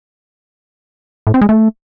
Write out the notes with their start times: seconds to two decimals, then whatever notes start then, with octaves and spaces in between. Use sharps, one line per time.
1.27 A2
1.34 C4
1.41 G#3
1.49 A3